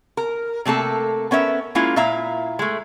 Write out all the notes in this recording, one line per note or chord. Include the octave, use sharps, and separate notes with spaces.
A#4
C3 A3 A#3 A4
B3 C#4 A#4 E5
G#3 A#3 C#4 E4 F4
A#2 E4 E5 F5 A#5
G#3 A3